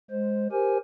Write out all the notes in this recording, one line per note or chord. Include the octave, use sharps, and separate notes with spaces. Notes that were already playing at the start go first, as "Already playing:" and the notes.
G#3 C5
G4 A#4 C5 G#5